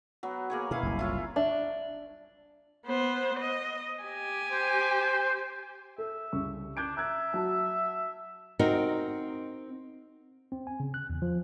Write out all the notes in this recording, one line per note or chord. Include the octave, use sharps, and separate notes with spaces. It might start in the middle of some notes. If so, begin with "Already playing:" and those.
F#3 B3
A#3 G#4 C#5
B2 E4 G#4 F5
F#1 C2
E4 F4 C#5
D4 E5
B3 C5
D#5
G4 G#5
C5
A4 E5
C2 C#3 C#6
D4 G6 G#6 D7
E5 A#5 F#6 G#6
F#3 F#4 A5
C4 D#4 F#4 A#4
C4
G#5
C#3
F#6
E2
F3